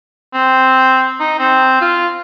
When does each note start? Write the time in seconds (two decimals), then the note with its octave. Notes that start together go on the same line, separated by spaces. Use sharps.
0.34 C4
1.20 D#4
1.39 C4
1.81 F4